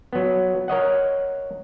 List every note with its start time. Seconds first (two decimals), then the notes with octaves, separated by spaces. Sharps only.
0.13 F#3 B3
0.68 A#4 C#5 D#5 F#5